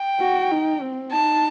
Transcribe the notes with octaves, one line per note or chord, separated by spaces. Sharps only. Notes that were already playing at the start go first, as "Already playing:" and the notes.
Already playing: G5
F#4
D#4
C4
D#4 A5